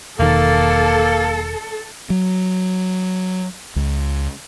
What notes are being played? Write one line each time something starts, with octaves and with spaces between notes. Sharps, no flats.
E1 D#3 A#3 A4
F#3
C#2